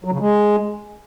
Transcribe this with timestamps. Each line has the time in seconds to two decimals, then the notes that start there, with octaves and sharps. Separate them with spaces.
0.04 F#3
0.12 C#3
0.20 G#3